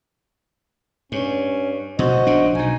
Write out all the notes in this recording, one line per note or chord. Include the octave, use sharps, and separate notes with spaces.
G2 C#4
B2 F#4 C5 D#5
A#1 C#3 D4
B1 B2 D#4 G#5